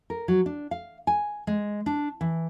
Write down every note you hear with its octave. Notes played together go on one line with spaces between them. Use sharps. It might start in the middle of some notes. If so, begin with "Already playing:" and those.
A#4
F#3
D4
F5
G#5
G#3
D4
E3